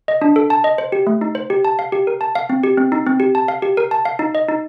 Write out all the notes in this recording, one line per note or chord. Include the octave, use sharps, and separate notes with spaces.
D#5
D4
A4
A5
D#5
C5
G4
A3
D#4
C5
G4
A5
F5
G4
A#4
A5
F5
C4
G4
C4
D#4
C4
G4
A5
F5
G4
A#4
A5
F5
D#4
D#5
D#4